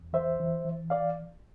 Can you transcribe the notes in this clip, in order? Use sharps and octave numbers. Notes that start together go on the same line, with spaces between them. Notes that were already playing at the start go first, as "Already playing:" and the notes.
Already playing: E2
E3 C5 E5
E3
E3
D5 F5